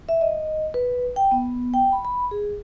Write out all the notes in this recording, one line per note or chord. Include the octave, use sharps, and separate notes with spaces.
E5
D#5
B4
G5
B3
G5
B5
B5
G#4